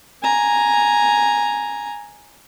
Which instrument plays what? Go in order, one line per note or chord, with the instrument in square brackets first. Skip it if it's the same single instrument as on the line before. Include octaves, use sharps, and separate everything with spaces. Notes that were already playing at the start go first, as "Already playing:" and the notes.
[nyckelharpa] G#5 A#5